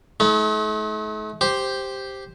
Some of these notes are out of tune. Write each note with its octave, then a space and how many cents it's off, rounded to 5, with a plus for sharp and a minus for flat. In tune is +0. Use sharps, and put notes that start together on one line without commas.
A3 -40 D#4 +45
G4 +0 C5 +0